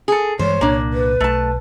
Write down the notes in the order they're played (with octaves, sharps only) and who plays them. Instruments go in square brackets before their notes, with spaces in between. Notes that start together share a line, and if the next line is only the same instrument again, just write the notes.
[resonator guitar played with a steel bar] G#4 A4
[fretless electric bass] G2 E3 G#3 [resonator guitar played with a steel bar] C5 [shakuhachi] C#5
[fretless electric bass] C2 A#2 [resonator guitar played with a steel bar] A#3 D4
[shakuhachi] B4
[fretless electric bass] B1 [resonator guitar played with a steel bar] A3 A5